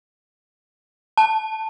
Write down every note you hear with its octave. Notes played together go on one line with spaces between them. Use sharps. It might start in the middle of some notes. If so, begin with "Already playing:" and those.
A5